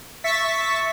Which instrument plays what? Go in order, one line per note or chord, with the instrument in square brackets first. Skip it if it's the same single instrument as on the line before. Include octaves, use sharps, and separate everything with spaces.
[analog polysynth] E5 C#6 A6 B6